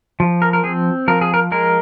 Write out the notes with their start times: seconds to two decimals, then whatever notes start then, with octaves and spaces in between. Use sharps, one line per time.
0.20 F3
0.42 A#4
0.53 A#4
0.63 C4 G#4
1.08 F3 A#4
1.21 G#4
1.34 A#4
1.52 G#3 A#4